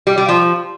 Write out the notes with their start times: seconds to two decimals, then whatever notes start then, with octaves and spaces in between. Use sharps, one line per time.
0.07 G3
0.18 G3
0.28 F3